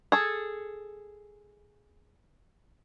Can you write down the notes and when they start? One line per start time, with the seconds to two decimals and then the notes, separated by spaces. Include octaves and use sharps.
0.12 G#4 A4